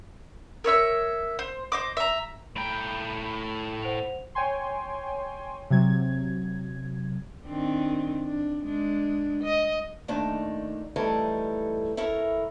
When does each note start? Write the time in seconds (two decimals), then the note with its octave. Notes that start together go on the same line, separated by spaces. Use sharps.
0.64 A#4 C#5 E5 E6
1.39 C5
1.72 C5 D#5 D6
1.97 E5 A#5
2.56 A2 G5 A#5 B5
3.82 C5 F#5 F7
4.35 C#5 G5 G#5 C6
5.70 C3 F#3 G#6
7.45 D#3 C4 D4
8.26 D4
8.63 G#3 D4
9.44 D#5
10.08 A#2 D#3 A3 D4 D#4
10.96 E3 G3 A3 D#4 A4 A#4
11.97 E4 A4 A#4 C#5